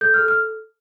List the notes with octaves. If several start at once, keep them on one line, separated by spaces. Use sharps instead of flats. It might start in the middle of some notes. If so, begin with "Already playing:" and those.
A4 G6
A4 F6
F6